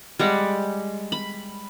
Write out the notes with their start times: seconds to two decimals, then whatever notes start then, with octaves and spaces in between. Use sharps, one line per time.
0.19 G3 G#3 F#5
1.12 B5